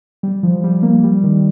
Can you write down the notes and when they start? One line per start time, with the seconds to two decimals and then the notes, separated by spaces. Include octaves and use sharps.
0.23 G3
0.43 F3
0.64 G3
0.83 A#3
1.04 G3
1.24 D#3